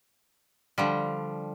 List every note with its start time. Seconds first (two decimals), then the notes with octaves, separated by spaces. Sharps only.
0.78 D3 F3 G3